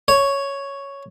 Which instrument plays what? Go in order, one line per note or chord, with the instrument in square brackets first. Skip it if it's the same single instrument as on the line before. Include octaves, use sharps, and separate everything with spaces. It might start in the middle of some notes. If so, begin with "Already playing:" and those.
[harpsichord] C#5